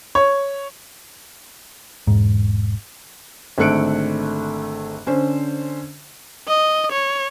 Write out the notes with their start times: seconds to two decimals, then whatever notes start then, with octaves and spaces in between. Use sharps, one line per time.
0.15 C#5
2.07 E1 G#2
3.58 G#1 D3 A3 F#6 C#7 D7
5.07 D3 C#4 C5
6.48 D#5
6.92 C#5